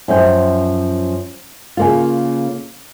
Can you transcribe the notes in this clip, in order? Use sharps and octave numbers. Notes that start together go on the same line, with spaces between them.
F#2 F3 C#4 G5
C#3 A#3 F4